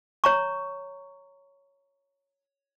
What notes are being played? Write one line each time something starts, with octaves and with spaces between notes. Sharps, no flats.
C#5 A#5 C#6